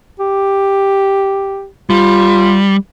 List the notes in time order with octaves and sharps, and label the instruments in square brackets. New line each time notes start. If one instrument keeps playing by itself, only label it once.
[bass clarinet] G4
[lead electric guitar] G3 [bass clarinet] F4